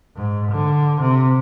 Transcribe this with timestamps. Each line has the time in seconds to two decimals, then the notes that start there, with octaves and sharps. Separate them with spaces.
0.16 G#2
0.51 D3
1.00 C3